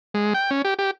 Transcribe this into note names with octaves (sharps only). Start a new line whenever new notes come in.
G#3
G5
C#4
G4
G4